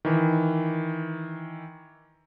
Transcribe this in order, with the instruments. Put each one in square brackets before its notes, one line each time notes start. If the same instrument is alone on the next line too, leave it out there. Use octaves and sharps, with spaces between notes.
[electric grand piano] D#3 E3